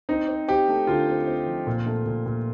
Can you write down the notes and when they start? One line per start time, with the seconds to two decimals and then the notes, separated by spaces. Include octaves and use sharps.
0.09 C4 D#4
0.28 C4
0.48 C4 G4
0.68 A3
0.87 D3 F4
1.08 C4
1.28 C4
1.46 F3
1.67 A#2
1.86 A3
2.06 A#2
2.26 A#2